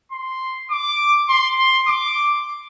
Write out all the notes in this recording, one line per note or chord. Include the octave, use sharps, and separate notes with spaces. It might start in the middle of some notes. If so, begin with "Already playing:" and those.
C6
D6
C6
C6
D6